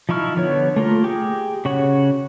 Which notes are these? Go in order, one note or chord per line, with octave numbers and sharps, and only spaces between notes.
F3 D#4 E4 C#6 F6
D3 B3 C#5
A3 A#3 F4 A#4
G4 G#4
C#3 F#4 C#5 F#5